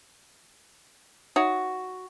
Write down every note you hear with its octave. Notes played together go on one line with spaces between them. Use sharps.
D#4 F#4 C#5 E5